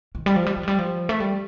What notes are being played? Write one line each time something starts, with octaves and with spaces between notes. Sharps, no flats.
D#3
G3
F3
G3
G3
F3
G3
F3
A3
G3